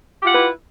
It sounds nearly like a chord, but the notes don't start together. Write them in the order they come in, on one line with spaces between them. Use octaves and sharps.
G4 F4 F#5 E4 B4